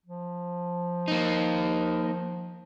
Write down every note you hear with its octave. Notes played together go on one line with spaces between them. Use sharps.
F3
A#3 D#4